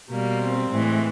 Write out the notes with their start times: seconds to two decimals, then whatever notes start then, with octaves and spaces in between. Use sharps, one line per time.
0.10 B2 G3 A#3
0.41 C4
0.70 A2 E3 G#3